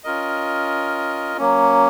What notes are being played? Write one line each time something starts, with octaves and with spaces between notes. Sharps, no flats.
C#4 F4 A#4 D#5
F#3 A#3 C#4